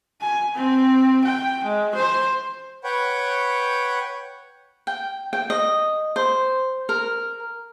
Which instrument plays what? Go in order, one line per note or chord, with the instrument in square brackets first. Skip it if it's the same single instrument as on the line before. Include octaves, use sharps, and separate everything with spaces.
[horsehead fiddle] G#5
C4
G5
G#3
C5
[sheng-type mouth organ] B4 C#5 F#5 G5
[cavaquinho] G5
G5
D#5
C5
A#4